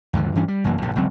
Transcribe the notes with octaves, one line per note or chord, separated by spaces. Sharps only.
D#2 G#2 D3 F3
G2 E3 C#4 D4
G3
F1 F#2 E3 A#3
A#1 F#2 C#3
G1 C#2 F#3 C4